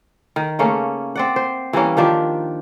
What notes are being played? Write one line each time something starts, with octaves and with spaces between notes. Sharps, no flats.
D#3
C#3 A3 A#3 C#4
C4 D5 F#5
C5
E3 G3 A#3 C#4
D#3 F3 D4 G4